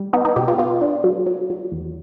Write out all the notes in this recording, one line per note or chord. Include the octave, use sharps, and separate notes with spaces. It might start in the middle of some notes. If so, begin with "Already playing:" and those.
Already playing: G3
B3 D#4
D#4
B2 G4
F4
B3 F4
D4
F#3
F#3
F#3
E2